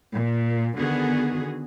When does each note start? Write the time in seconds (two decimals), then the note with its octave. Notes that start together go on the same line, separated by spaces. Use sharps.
0.13 A#2
0.78 D3 D#3 B3 F#4 G#4